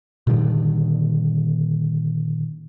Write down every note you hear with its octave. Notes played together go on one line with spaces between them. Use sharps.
A#2 D3 D#3 G3